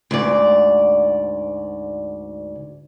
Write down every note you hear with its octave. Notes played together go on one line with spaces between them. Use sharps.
D2 G#2 D5